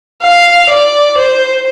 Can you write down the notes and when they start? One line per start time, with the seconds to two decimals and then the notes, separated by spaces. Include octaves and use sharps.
0.22 F5
0.70 D5
1.18 C5